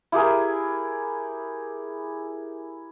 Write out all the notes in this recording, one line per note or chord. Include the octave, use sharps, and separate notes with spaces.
E4 G4 G#4 A#4